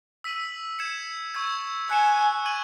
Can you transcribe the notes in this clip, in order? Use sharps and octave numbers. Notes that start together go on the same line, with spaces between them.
E6 B6 D#7 F#7
G#6 C#7 E7
C#6 E6 G#6
G#5 F#6 C#7 E7
C#6 G#6 D#7 F#7